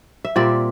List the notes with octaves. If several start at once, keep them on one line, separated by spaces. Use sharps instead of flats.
E5
A#2 G3 C4 D5